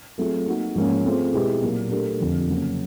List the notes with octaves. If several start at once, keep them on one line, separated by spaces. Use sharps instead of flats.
F#3 A3 C4 F4 G#4
A#3 D#4 F#4
G#2 F3 A#3 C#4
A3 C4 F4 G#4 C5
B2 G#3 B3 E4 G4
A#2 F#3 A#3
A3 D4 G4 A#4
F2 D3 F3
C#3 F#3 A#3 C#4